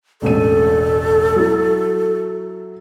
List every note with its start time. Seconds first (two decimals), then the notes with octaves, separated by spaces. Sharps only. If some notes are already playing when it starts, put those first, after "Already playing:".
0.22 E1 A1 A4 D#7
1.36 F#3 E4